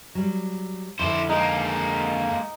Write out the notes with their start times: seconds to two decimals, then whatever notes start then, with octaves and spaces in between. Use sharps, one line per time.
0.15 F#3 G3
0.99 F2 D3 E4 C5
1.29 G#3 A#3 D#4